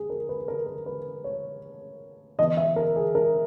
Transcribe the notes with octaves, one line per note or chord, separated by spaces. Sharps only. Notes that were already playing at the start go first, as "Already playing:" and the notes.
Already playing: G#4
A#4
B4
A#4
A#4
B4
C#5
E3 B3 D#5
E5
A#4
G#4
A#4